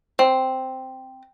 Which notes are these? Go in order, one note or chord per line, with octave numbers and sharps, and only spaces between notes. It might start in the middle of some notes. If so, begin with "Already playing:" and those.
C4